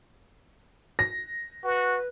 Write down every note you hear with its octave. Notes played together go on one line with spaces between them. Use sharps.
A#6
F#4 B4